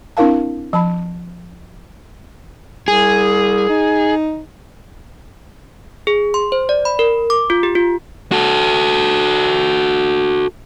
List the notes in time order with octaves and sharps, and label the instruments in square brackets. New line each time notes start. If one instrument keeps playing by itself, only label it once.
[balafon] C4 D4 E4 A#4 F5 A5
F3 A5 B5
[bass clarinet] C2 [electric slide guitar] G#4
[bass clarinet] D#4
[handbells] G#4
C6
C5
D5
B5
A#4
D6
F4
G4
F4
[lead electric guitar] F#4 A4